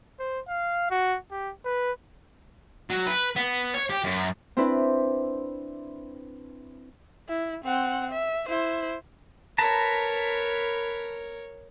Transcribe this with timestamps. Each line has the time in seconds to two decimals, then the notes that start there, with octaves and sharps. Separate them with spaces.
0.19 C5
0.49 F5
0.91 F#4
1.31 G4
1.65 B4
2.90 F#3
3.07 B4
3.36 B3
3.74 C#5
3.90 G4
4.04 F#2
4.57 C4 D4 E4 B4
7.29 E4
7.64 C4 F#5
8.12 E5
8.49 E4 C5
9.58 A#4 B4 C#5 A5 A#5